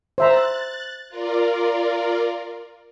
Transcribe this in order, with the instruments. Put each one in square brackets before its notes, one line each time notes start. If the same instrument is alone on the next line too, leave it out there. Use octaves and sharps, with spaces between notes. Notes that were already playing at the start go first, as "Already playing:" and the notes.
[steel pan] C5 E5 A#5 [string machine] F#6 A6
[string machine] F4 A#4 D5